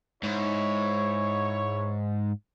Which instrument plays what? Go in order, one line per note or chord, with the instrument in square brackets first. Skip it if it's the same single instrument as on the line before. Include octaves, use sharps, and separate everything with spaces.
[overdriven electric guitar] G#2 [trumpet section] E4 C#5